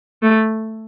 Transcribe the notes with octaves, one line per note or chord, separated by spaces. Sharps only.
A3